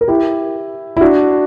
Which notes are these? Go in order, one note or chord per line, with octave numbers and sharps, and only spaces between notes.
A#4
E4 G4
E4
D4 F#4